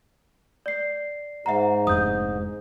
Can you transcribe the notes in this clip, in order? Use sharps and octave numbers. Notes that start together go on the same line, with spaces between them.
D5 C7
G#2 E5 F#5 A#5
F1 D3 D#6 G6